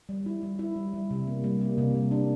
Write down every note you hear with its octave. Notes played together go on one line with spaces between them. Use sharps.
G3
E4
G3
E4
G3
G3
C3
A#3
G3
A#3
C3
G3
D4